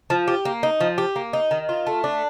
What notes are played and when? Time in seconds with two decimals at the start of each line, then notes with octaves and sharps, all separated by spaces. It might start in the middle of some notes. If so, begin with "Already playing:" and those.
0.10 F3
0.28 G4
0.45 A#3
0.63 D#4
0.81 F3
0.98 G4
1.16 A#3
1.33 D#4
1.51 D#3
1.69 F4
1.87 A3
2.04 D4